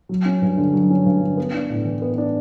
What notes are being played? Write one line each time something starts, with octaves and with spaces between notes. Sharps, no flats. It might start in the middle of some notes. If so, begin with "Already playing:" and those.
F#3
C#4
G2
D3
F#3
C#4
G2
D3
B3
D4
A2
E3
B3
D4